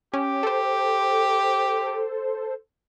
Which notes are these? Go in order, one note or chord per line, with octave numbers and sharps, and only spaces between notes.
C#4 G4
A4 C5